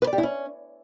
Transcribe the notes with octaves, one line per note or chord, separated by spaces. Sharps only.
B4
D5
G4
E4
C#4